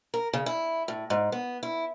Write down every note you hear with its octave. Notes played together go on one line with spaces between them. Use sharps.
A#4
C#3
E4
A2
G#2
B3
E4